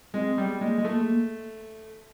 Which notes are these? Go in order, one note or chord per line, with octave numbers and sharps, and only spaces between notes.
G#3 C4
G3 B3
G#3 A#3
G#3
A3 A#3
A#3